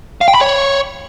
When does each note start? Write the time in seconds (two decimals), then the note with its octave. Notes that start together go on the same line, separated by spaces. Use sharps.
0.21 F5
0.28 G5
0.35 B5
0.41 C#5